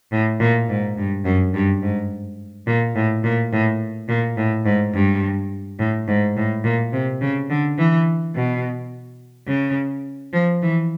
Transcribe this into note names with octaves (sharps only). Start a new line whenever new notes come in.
A2
A#2
G#2
G2
F#2
G2
G#2
A#2
A2
A#2
A2
A#2
A2
G#2
G2
A2
G#2
A2
A#2
C3
C#3
D3
E3
B2
C#3
F3
E3